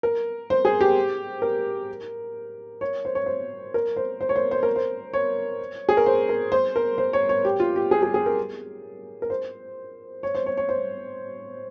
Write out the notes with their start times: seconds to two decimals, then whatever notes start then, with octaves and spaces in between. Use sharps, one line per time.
0.03 A#4
0.50 C5
0.65 G#4
0.81 G4
1.42 A#4
2.81 C#5
3.05 C5
3.15 C#5
3.26 C5
3.74 A#4
3.97 C5
4.21 C5
4.29 C#5
4.36 C5
4.51 C5
4.63 A#4
4.76 C5
5.13 C#5
5.89 G#4
5.97 A#4
6.06 C5
6.29 A#4
6.52 C5
6.76 A#4
6.98 C5
7.13 C#5
7.29 C#5
7.45 G4
7.60 F4
7.76 G4
7.91 G#4
8.03 G#4
8.14 G#4
8.26 A#4
9.22 A#4
9.30 C5
10.23 C#5
10.35 C5
10.46 C#5
10.57 C#5
10.69 C5